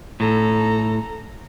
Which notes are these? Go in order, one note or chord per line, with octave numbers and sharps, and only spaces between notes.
A2 A4 A#5